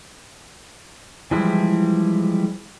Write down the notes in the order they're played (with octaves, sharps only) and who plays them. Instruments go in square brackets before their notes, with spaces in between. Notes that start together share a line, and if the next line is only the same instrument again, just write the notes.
[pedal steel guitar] E3 F3 G3 G#3 E4